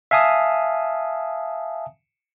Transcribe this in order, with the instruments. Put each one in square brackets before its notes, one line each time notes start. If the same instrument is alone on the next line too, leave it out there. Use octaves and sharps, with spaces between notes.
[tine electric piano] E5 F5 G#5 A5 D#6